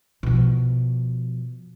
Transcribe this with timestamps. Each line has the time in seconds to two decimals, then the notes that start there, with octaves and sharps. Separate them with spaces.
0.23 B2 F3